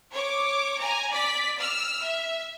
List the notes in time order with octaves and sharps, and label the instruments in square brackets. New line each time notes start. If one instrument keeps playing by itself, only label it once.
[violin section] C#5 D6
G#5 A#5
D5 B6
E6 F6
E5